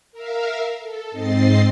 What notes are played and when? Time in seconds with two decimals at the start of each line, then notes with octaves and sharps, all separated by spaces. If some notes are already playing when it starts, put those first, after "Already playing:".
0.12 A#4 E5 F5
0.80 A4
1.11 G#2 C4 D#5 A6 C7